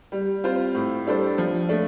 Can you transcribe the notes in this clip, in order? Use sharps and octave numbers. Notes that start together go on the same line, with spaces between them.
G3
C4 F4 C5
A2
G3 D4 A4 C5
F3
A3 D4